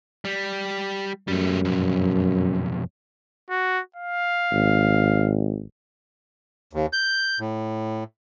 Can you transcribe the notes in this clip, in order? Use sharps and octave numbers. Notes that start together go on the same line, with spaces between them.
G3
F#2 G3 A3
B1 F2
F#4
F5
G#1
D#2
G6
A2